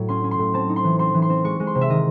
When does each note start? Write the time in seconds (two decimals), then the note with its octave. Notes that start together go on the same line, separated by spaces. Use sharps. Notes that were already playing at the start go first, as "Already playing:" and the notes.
Already playing: A2 F#3
0.09 C#4 C6
0.24 C#4
0.31 C6
0.39 A2
0.54 C4 A5
0.69 D#4
0.76 C6
0.84 E3
0.99 C4 C6
1.14 E3
1.22 C6
1.30 C4
1.44 G#3 C#6
1.60 G#3
1.67 C6
1.75 C3
1.81 E5
1.90 D#3 D#5